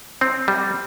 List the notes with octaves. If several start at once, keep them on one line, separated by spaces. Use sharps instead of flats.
C4
G3